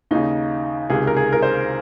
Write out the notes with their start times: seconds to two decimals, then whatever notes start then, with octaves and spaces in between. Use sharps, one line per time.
0.11 D#2 C#3 D#4
0.90 C#2 C3 D#3 G#4
1.07 A#4
1.17 G#4
1.32 A#4
1.42 C5